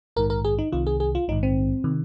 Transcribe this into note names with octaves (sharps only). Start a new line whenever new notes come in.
A#1 G#2 D#3 A#4
A#4
G#4
D#4
C2 C3 D#3 F4
G#4
G#4
F4
A#1 G#2 D#3 D#4
C4
C3 D#3